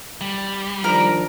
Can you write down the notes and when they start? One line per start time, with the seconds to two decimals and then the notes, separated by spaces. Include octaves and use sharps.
0.21 G3
0.84 D#3 F3 D4 A#4